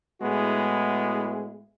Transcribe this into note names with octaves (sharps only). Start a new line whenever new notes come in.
A2 G#3 B3 E4 F#4 G#4